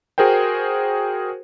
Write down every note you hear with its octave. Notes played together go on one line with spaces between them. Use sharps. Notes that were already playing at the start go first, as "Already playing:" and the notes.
F#4 G#4 A#4 C5 G5